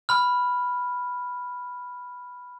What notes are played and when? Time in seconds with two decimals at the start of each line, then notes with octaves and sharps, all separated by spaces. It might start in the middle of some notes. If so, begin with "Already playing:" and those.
0.09 B5 F6